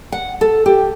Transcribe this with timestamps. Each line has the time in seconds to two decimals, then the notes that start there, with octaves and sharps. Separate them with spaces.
0.12 F#5
0.41 A4
0.66 G4